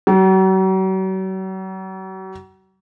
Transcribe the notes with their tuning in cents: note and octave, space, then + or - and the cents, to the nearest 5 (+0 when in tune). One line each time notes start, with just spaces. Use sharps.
F#3 +40